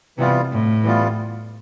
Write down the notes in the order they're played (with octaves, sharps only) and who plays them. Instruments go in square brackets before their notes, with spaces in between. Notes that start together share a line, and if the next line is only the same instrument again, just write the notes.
[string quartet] C3 [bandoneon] E3 G3 B3 F4
[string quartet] A2
[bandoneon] E3 G3 B3 F4